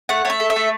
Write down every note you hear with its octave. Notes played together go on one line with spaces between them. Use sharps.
A3 F#5
A3 C#5 E5
A4
E5
A3